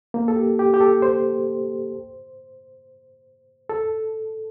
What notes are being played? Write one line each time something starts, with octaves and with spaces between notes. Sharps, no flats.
A#3
A4
G4
G4
G4
A4
C5
A4